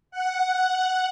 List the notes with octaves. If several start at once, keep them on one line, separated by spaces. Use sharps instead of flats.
F#5